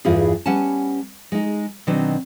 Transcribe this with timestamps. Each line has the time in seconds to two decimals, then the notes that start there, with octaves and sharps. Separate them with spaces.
0.05 E2 G2 E4 F4 G#4
0.46 G3 B3 C#4 F#5 G#5 A5
1.32 G#3 D#4
1.87 B2 D#3 F#3 C4 D4 D#4